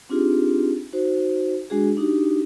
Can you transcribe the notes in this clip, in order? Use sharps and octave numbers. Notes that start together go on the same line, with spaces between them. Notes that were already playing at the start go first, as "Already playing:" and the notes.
C4 D4 D#4 F4 G4 G#4
D#4 F#4 C5
G#3 D4 F#4 G#4
D4 D#4 F#4 G4